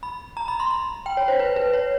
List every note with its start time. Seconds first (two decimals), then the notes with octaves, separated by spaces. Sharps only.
0.03 B5
0.37 A#5
0.48 B5
0.60 C6
0.71 B5
1.06 G5
1.17 C#5
1.28 C5
1.40 B4
1.56 B4
1.73 C#5